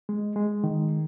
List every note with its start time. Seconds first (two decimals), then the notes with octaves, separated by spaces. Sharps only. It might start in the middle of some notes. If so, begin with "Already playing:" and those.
0.09 G#3
0.36 G#3
0.64 D#3